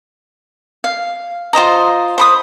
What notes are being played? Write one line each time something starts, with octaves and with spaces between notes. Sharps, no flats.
F5
F4 C5 D#5 A#5
C5 B5 D#6